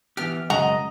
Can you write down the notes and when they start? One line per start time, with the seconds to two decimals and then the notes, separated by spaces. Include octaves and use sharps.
0.17 E3 B3 G4 F6
0.50 F#2 C#3 G#3 F#4 D#5 A#5